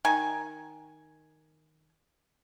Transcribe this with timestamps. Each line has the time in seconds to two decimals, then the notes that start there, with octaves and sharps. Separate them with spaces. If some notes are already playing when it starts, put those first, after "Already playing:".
0.05 D#3 G#5